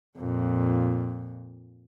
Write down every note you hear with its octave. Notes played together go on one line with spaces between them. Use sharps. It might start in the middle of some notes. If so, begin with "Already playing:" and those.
F2 A#2